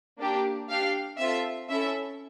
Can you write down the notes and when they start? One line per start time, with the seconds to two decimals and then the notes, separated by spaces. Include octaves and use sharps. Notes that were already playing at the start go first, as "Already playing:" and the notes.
0.20 A#3 D4 G4
0.69 D4 G4 F5
1.19 C4 F4 A4 E5
1.69 C#4 E4 A4 E5